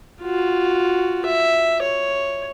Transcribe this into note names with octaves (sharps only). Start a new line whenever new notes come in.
F4 F#4
E5
C#5